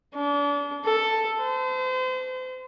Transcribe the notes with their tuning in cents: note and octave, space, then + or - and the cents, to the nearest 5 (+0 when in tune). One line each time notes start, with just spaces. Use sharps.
D4 -35
A4 +5
C5 -35